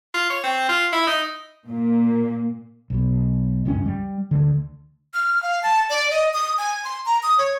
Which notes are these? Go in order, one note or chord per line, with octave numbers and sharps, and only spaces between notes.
F4
C#5
C4
F4
E4
D#4
A#2 A#3
B1 B2
F#1 C#2 G2 C#4
G3
D2 D3
F6
F5
A5
D5
D#5
D#6
G#5
C6
A#5
D#6
C#5